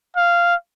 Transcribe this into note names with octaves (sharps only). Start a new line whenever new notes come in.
F5